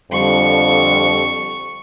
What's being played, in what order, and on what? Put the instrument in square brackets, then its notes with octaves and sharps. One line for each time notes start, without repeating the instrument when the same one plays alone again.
[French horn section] F2 D3 G3 [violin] C#6